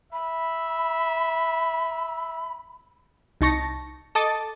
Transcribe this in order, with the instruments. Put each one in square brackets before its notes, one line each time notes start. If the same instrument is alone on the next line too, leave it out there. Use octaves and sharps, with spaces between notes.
[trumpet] E5 [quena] B5
[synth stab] C2 D#4 A5 C#6 A#6 C#7
A4 D#5 A5 D6 D#6 A6